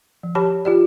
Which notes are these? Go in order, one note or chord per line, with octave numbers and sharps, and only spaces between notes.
F3
G4 C#5 A5 B5
F4 G4 D5